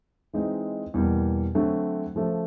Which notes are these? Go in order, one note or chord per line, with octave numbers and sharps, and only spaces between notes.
E3 G#3 C4 D#4
E2 B2 G3 A#3
D3 F#3 A3 C4
C#3 F3 A3